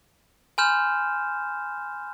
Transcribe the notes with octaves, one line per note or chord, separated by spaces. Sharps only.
G#5 B5 C6 F6 G6 E7